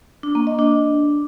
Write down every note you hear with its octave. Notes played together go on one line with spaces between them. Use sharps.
D4
A#3
D#5
D4